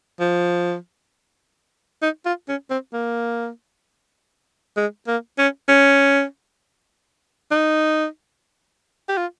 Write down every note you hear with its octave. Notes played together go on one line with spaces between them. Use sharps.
F3
D#4
F4
C#4
C4
A#3
G#3
A#3
C#4
C#4
D#4
G4
F4